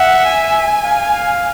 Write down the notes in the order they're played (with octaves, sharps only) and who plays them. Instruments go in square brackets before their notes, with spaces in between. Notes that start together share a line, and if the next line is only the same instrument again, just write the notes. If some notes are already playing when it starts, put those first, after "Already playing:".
Already playing: [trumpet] E5 [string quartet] F#5
[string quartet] G#5
[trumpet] F5